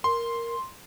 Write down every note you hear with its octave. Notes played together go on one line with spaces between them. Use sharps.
A#4 C6